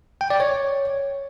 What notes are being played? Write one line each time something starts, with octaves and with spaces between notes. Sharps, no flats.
G5
D5
C#5